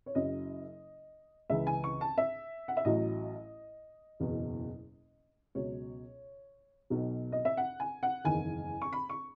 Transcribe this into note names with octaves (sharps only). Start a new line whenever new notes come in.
C#5
F#1 F#2 C#3 F#3 D#5
C#2 C#3 E3 E5
G#5
C#6
A5
E5
F#5
E5
A1 A2 F#3 D#5
F#1 E2 B2
C#2 B2 F#3 C#5
B1 B2 F#3
D#5
E5
F#5
G#5
F#5
F#1 E2 D#3 G#5
C#6
B5
C#6